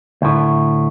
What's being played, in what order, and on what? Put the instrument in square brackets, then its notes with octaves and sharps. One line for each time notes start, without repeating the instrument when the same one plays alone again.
[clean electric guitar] D2 A2